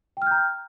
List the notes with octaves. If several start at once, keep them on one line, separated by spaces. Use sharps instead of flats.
G5 A#5 F6 G6